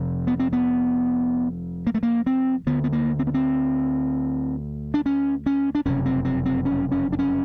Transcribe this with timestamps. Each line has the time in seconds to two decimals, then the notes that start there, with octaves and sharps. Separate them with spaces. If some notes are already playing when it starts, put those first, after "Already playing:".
Already playing: F1 F2 C3
0.27 B3
0.40 C4
0.53 B3
1.87 A#3
1.94 A3
2.03 A#3
2.26 C4
2.66 D2 D3 B3
2.84 B3
2.92 A#3
3.19 C4
3.27 B3
3.34 C4
4.94 D4
5.06 C#4
5.46 C#4
5.75 D4
5.85 F#1 F2 C3 C#4
6.06 C4
6.25 C4
6.46 C4
6.65 C#4
6.92 C#4
7.12 D4
7.19 C#4